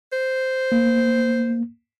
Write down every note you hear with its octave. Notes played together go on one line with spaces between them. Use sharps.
C5
A#3